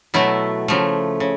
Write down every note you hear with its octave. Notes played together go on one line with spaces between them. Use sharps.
B2 F#3 A3 E4
C#3 F3 A3
C#3